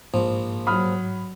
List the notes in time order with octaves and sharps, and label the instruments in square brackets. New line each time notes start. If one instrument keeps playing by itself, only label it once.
[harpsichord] A#1 F3 [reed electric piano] G#2
[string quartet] F#3 [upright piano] B5 D#6 F6